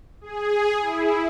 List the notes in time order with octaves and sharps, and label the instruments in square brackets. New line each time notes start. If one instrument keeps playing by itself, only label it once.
[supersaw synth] G#4
E4